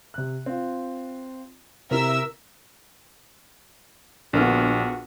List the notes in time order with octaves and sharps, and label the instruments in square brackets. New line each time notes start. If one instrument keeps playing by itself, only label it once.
[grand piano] C3 F#6
C4 F4
[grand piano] C3 C4 E4 [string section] A#4 E5 E6
[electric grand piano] A#1 [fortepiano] D3 A#3 F6 [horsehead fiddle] B3 F#4